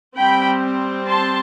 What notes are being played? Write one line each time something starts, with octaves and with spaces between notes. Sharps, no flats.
G3 C4 G5 B5
A5 C6